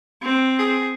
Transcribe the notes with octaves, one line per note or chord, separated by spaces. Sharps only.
C4
G#4